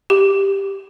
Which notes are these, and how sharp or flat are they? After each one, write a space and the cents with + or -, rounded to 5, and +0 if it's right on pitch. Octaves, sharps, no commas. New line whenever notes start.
G4 +5